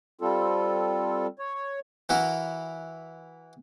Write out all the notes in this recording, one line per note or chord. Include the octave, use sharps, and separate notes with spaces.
G3 C4 F4 A4
C#5
E3 E4 F#4 A#4